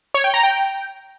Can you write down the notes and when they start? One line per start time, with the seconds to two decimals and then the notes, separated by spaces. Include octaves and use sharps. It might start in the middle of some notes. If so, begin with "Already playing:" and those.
0.14 C#5
0.24 G5
0.34 A#5
0.43 G5